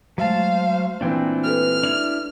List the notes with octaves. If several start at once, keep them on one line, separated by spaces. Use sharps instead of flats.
F#3 G#3 A3 C5 F5 A5
A#2 E3 C4 D4 G5
F#4 A4 B4 F6
D4 E4 F7